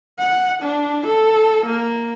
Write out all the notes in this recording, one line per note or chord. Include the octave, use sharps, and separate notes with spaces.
F#5
D4
A4
A#3